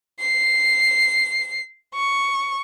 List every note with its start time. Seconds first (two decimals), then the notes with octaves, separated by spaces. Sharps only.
0.20 C7
1.95 C#6